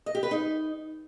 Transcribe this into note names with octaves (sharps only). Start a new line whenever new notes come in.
D#5
G4
B4
D#4